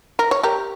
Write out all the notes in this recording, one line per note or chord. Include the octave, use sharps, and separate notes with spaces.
A#4
C#5
G4 A#4